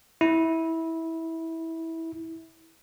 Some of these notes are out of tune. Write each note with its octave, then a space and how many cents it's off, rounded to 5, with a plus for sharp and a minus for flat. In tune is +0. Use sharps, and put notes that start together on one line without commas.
E4 -15